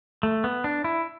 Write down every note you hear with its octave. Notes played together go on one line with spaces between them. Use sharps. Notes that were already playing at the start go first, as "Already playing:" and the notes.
A3
B3
D4
E4